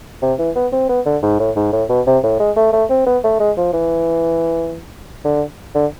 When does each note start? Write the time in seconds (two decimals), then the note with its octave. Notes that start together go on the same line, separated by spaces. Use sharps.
0.22 C3
0.39 E3
0.56 B3
0.73 C4
0.89 B3
1.06 D3
1.23 G#2
1.39 A2
1.56 G#2
1.73 A2
1.89 B2
2.07 C3
2.23 A2
2.40 G#3
2.56 A3
2.73 A3
2.90 C4
3.07 B3
3.24 A3
3.40 G#3
3.57 F3
3.73 E3
5.25 D3
5.75 D3